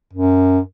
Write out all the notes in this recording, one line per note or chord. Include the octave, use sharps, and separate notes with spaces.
F#2